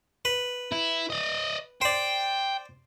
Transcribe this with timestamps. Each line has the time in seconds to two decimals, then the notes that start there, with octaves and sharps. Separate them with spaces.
0.25 B4
0.72 E4
1.10 D5 D#5
1.82 C5 D5 G5